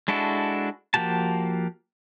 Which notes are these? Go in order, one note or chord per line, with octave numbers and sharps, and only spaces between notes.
G#3 D4 E4 F#4 A4
F3 A#3 F#4 G4 A5